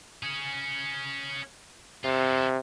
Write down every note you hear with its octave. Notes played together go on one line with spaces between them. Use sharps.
C#4 G#4
C3 F4 A4